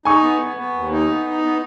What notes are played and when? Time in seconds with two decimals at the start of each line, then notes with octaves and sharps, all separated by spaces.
0.05 D#4 G#5 C#6
0.22 B3
0.40 B3
0.57 B3
0.74 D#2
0.92 D#4
1.09 B3
1.26 D#4
1.42 B3